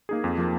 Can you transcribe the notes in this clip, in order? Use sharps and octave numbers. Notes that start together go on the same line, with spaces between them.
A#3 D#4 G#4
F2
F3 A#3